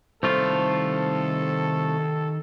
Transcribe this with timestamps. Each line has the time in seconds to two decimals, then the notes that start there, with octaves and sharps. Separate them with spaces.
0.23 C2 D#3 A3 F4 A4 C5 B5